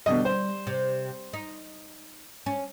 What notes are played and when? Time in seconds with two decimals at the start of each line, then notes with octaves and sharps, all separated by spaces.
0.06 B2 D3 G3 D#5
0.25 C5
0.67 C3
1.33 D#4
2.46 C#4